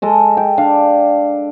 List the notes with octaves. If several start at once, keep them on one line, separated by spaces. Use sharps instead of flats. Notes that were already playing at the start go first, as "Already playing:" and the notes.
G#3 A4 D#5
G5
D4 D5 F5